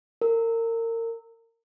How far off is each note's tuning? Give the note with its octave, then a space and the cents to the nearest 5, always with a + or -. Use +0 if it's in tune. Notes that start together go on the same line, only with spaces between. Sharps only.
A#4 -30